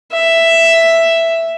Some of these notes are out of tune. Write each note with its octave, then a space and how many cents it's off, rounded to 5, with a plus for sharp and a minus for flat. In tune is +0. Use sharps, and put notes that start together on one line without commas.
E5 +5